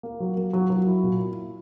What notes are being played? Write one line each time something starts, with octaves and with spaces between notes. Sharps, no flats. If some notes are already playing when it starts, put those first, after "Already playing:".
A#3
F#3
A#3
F#3
F#3
E4
A#2